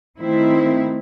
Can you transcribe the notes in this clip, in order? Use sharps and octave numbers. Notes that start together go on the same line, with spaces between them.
D#3 A3 C4 E4